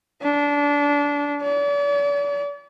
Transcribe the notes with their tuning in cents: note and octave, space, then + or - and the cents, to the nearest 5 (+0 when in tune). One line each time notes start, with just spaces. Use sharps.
D4 -25
D5 -45